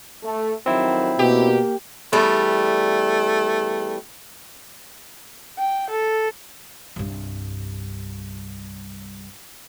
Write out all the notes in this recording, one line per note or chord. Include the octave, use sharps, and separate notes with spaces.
A3
F2 D#3 F#3 C4 E4
B2 A#3 G4
E2 G3 A3 D5
G5
A4
C2 G2